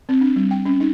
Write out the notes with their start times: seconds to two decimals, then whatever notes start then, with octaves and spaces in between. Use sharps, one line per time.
0.09 C4
0.21 D4
0.36 G3
0.51 G5
0.65 C#4
0.80 D#4